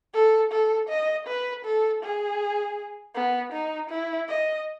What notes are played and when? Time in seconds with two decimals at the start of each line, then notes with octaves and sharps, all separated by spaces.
0.14 A4
0.51 A4
0.89 D#5
1.27 B4
1.65 A4
2.03 G#4
3.15 B3
3.53 D#4
3.90 E4
4.29 D#5